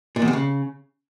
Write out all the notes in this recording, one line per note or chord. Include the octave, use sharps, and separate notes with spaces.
A#2
E2
C3
C#3